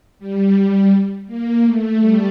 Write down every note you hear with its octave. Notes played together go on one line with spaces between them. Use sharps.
G3
A#3
A3
G3